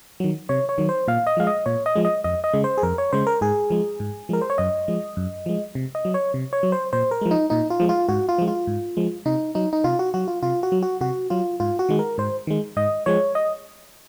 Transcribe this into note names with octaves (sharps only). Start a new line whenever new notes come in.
D#3 F#3
C3 C#5
C#5
D#3 F#3
C5
A#2 F5
D#5
F3 G#3 F5
D#5
A#2 C#5
D#5
F3 G#3
D#5
F2 D#5
D#5
C#3 G#3
C5
G#4
F2 A#4
C#5
C#3 G#3 C5
A#4
G#2 G#4
F3 G#3
G#2
F3 G#3 A#4
C5
C#5
F#2 D#5
F3 G#3
F#2
F3 G#3
C3
D#5
F#3
C#5
C3
C#5
F#3
C5
A#2 C5
A#4
F3 G#3
D#4
A#2 D#4
F4
F3 G#3
F4
G#2 F#4
F4
F3 G#3
F4
G#2
F3 G#3
C3 D#4
F#3 D#4
D#4
C3 F4
F#4
F#3 F#4
F4
C3 F4
F#4
F#3
F#4
C3 F#4
F#3 F4
G#2 F4
F#4
D#3 G#3
A#4
G#2 C5
D#3 G#3
G#2 D#5
F3 G#3 C#5
D#5